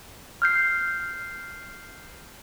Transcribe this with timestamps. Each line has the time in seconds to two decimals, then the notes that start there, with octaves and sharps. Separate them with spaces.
0.42 F6 G6 C7